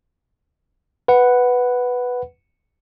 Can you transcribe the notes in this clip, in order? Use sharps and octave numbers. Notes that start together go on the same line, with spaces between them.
B4 F#5